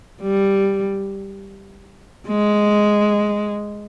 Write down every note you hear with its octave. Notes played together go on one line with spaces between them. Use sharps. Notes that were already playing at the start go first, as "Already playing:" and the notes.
G3
G#3